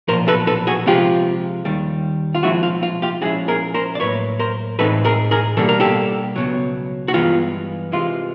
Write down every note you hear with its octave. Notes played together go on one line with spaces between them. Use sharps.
B1 A#2 F3 A#4 C5
A4 B4
A4 B4
F#4 G#4
C3 F3 G#3 F4 G4
D#2 D#3 G3
F4
B1 A#2 F3 G#3 C4 E4 F#4
F4
F4
F4 G4
A#2 F3 G#3 C#4 E4 F#4 G#4
G#4 A#4
A#4 C5
D5
A2 F#3 A#3 B4 C#5
A#4 C5
A2 E3 G#3 C4 D#4 A4 B4
G#4 A#4
G#4 A#4
B2 G3 A#3 D4 A4
A#4
G4 A4
C#2 B2 F#3
F#4
G2 E3 G#3 B3 F4 G4
C3 E3 G#3 F4